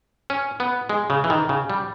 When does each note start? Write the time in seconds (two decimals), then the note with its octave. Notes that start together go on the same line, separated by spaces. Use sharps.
0.30 C#4
0.60 B3
0.89 G#3
1.10 C#3
1.24 E3
1.30 D#3
1.49 C#3
1.70 G3